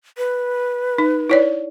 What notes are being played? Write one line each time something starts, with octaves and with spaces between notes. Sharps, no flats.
B4
D#4
E4 C#5 D5